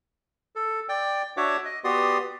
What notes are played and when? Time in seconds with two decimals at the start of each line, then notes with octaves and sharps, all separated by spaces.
0.56 A4
0.89 D5 G5
1.37 D4 F#4 C#5 E5 F#5 D6
1.65 D#5
1.84 B3 F#4 G4 D5 C6 D#6